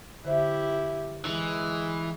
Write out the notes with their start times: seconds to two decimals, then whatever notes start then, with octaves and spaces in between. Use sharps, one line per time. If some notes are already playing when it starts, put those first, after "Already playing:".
0.25 D3 E4 G4 C5 E5
1.25 E3 G#3